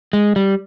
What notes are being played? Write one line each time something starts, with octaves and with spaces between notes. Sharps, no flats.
G#3
G3